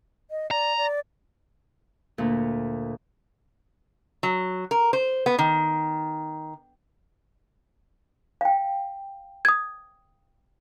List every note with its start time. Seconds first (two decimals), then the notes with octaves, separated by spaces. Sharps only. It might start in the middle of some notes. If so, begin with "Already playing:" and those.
0.31 D#5
0.51 D5 A#5
0.77 D5
2.18 D2 A#2
4.23 F#3
4.71 A#4
4.93 C5
5.26 B3
5.39 D#3
8.41 F5 G5
9.45 D#6 G#6